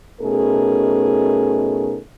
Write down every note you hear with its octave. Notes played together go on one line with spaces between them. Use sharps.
B2 A3 C#4 D#4 G#4 A#4